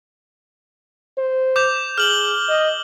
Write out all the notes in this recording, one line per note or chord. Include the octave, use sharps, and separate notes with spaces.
C5
D6 G6 F7
G#4 F6 F#7 G7
D#5